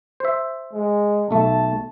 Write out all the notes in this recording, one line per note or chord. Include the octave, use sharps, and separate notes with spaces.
C5 E5
G#3
B1 A3 A5